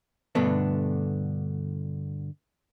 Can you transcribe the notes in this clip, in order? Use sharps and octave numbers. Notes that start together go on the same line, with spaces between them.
G2 B2 D3 A3 B3 D4